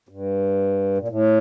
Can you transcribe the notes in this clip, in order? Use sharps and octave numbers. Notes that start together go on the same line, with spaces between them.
G2
A#2
A2